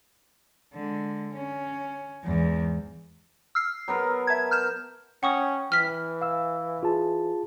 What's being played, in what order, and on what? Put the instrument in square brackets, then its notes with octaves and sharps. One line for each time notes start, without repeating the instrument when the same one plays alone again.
[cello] D3 G#3
C#4
E2 G#2
[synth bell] E6 F6 C7
[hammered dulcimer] F#3 B3 A#4
[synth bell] E5 A5 G#6
F6 G6 E7
[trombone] C#4 [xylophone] F#5 C#6 D#6 [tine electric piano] G5
[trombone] E3 [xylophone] F6 B6
[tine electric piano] F5 E6
F4 G#4 A5